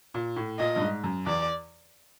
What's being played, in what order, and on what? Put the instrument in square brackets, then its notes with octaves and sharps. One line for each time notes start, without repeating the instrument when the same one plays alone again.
[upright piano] A#2
A2
[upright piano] A#2 [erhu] D#5
[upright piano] G2
G#2
F#2
[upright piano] E2 [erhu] D5